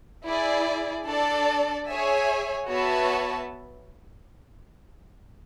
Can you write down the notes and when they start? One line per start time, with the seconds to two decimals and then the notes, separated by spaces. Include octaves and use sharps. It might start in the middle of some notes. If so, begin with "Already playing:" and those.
0.25 E4 G#4 D5
1.07 D4 A4 D5 A5
1.87 G#4 C#5 E5 G#5
2.69 B3 F#4 C#5 E5 A5